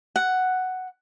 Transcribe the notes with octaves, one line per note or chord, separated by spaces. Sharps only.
F#5